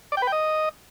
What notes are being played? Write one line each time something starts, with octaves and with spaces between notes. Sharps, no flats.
D5
G5
B4
G5
D#5